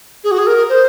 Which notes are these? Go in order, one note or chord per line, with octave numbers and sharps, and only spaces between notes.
G#4
F#4
G#4
A#4
C5